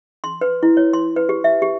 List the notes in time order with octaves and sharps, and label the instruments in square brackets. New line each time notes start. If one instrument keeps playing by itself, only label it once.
[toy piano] C6
B4
E4
C#5
C6
B4
G4
E5
G4